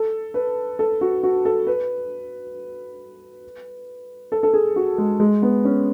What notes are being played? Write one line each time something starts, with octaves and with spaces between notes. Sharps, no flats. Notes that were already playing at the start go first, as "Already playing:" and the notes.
Already playing: A4
B4
A4
F#4
F#4
A4
B4
A4
A4
G#4
F#4
G#3
G#3
B3
C#4